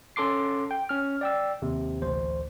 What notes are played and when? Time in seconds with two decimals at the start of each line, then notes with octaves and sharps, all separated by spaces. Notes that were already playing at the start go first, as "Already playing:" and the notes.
0.16 C#4 A4 C6 D6 C7
0.71 G5
0.89 C#4 F6
1.21 D5 G5 E6
1.62 D#2 C3
2.01 A1 D2 C5